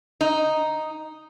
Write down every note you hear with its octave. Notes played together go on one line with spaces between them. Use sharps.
D#4